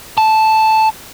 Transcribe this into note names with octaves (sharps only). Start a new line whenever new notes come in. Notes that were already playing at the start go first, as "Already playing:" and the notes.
A5